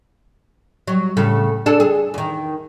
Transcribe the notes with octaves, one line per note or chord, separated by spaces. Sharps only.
F#3
A2 C#3 A4
D4 G#4 A4
G#4
E2 D#3